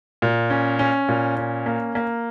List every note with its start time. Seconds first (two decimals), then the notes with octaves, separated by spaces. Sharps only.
0.22 A#2
0.50 C#4
0.79 C#4
1.08 A#2
1.37 C#4
1.66 A#3
1.95 A#3